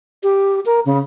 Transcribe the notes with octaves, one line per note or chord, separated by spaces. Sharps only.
G4
A#4
C#3